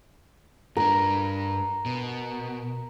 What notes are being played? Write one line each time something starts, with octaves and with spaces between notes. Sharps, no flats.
G2 D4 A#4
B2